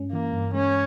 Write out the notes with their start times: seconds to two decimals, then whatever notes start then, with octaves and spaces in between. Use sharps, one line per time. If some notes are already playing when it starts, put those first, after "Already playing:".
Already playing: G2 G#3 C#4
0.12 E3 A#3
0.33 G2
0.54 G#3 C#4